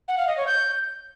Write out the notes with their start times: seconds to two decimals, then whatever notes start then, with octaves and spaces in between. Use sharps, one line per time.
0.08 F#5
0.18 F5
0.27 D#5
0.37 C#5
0.47 G6